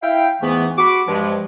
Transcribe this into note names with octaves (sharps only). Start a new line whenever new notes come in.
E4 F5 G5
E2 G#2 E3 A3 B3
F#4 B5 C#6 D6
G2 F3 G#3